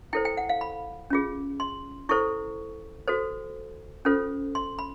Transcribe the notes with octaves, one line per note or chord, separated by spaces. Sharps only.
E4 A4 C5 G5
G5
F#5
F5
B5
C#4 F4 G#4
C6
E4 A4 C5 C#6
F#4 A4 C5
C#4 F4 A4 C5
C6
B5